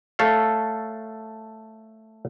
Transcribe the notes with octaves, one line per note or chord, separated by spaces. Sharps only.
A3 A4 C#5 F5